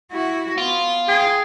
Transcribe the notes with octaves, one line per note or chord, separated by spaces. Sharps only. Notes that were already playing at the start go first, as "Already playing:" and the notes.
E4 F#4
B3 F4
G#4 G5